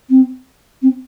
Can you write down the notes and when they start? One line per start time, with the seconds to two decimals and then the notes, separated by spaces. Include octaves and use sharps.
0.09 C4
0.82 C4